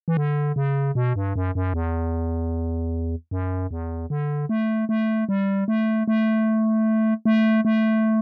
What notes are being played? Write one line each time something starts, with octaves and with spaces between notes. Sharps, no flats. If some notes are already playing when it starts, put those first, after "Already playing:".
E3
D3
C#3
B2
G2
F#2
F#2
E2
F#2
E2
D3
A3
A3
G3
A3
A3
A3
A3